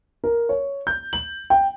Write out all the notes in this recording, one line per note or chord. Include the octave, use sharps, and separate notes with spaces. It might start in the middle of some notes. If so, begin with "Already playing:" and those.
A#4
C#5
G6
F#7
G5